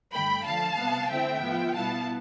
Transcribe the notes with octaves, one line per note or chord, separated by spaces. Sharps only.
G2 D3 A3 G5 B5
D3 F3 A3 F5 A5
C3 G3 B3
D3 A3 C4 E4 E5 G5
A2 F3 B3 F4
B2 G3 B3 E4 F5 A5